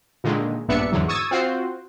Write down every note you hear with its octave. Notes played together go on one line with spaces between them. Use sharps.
A#2 D3 D#3 G#3
A#1 G2 B3 D4 E5 C#7
E2 G#2 D3 F#3
C#6 D#6 E6 G#6 A6 D#7
C4 F4 F#4 C5